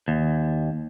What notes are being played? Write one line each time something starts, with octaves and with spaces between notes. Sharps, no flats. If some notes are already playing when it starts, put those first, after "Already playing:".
D#2